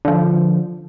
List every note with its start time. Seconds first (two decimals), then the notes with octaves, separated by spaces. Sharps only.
0.05 D3 F3